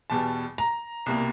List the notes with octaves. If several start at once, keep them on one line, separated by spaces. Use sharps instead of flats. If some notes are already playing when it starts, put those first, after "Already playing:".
E2 B2 G3 A5
A#5
C2 B2 G3 A#3